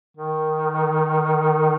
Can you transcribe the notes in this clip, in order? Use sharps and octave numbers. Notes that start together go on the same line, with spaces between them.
D#3